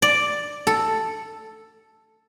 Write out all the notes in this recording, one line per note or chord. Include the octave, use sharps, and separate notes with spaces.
D5
A4